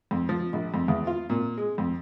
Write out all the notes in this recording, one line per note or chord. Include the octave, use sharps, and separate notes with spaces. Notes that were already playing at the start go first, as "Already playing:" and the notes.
F2
F3
A#1
F2
E2
F4
A#2
G#3
F2